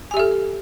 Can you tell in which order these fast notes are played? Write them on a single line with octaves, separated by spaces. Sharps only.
G#5 G4 E5 A4